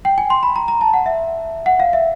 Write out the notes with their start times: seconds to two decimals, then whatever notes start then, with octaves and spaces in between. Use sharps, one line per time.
0.05 G5
0.18 G#5
0.30 C6
0.43 B5
0.56 A#5
0.68 A#5
0.81 A5
0.94 F#5
1.06 E5
1.66 F#5
1.80 F5
1.93 E5